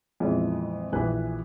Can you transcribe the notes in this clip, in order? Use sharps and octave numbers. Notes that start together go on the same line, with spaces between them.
F2 A#2 E3 G#3 B3
A#1 E3 G4 B4 G#5 F#6